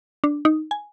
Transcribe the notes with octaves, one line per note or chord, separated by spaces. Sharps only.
D4
D#4
G#5